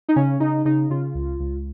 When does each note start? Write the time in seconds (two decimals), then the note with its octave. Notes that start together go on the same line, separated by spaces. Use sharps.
0.09 D#4
0.16 C#3 C#4
0.40 C#3 D#4
0.65 C#3 D#4
0.90 C#3 F4
1.14 C#2
1.40 C#2